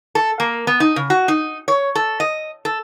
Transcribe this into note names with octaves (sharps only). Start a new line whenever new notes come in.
A4
A#3
B3
D#4
C#3
F#4
D#4
C#5
A4
D#5
A4